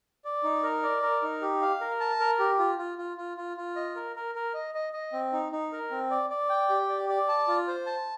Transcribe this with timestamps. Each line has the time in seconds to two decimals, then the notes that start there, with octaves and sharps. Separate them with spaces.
0.25 D5
0.43 D#4
0.63 A#4
0.83 D5
1.02 A#4
1.22 D#4
1.41 G4
1.61 F5
1.81 A#4
2.00 A5
2.20 A#4
2.39 G4
2.59 F4
2.78 F4
2.98 F4
3.17 F4
3.37 F4
3.57 F4
3.76 D#5
3.96 A#4
4.16 A#4
4.35 A#4
4.54 D#5
4.74 D#5
4.93 D#5
5.13 C4
5.32 D#4
5.52 D#4
5.72 A#4
5.91 C4
6.11 D5
6.30 D5
6.49 G5
6.69 G4
6.89 D5
7.09 D5
7.28 A5
7.48 F4
7.68 C5
7.86 A5